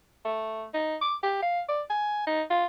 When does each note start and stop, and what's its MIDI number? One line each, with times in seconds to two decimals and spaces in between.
0.25 0.65 57
0.74 0.96 63
1.01 1.16 86
1.23 1.38 67
1.42 1.61 77
1.69 1.82 74
1.90 2.23 80
2.27 2.42 63
2.50 2.66 65